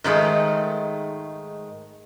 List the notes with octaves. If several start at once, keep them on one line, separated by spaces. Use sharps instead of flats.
G#2 D#3 G#3 A3